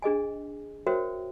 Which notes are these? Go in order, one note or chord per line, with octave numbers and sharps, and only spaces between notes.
D4 G#4 D#5 G#5
F#4 A#4 C5 C#5 E5 G5